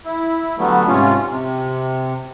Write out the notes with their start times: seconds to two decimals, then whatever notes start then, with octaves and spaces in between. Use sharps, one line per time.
0.05 E4
0.59 D3 F#3 G3 A3 B3
0.88 G#2 C3 C#4 F4
1.29 C3